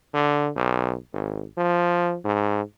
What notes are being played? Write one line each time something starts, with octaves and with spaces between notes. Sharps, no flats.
D3
B1
G#1
F3
G#2